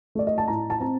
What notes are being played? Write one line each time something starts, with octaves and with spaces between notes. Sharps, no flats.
A3 D5
D#5
A5
A2 A#5
A5
C4 A#5